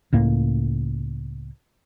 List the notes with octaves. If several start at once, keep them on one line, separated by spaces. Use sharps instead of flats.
C#2 A2 A#3